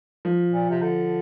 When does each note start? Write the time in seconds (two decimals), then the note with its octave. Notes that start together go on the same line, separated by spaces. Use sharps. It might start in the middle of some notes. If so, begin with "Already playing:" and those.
0.25 F3
0.52 A#2
0.70 C3
0.82 D3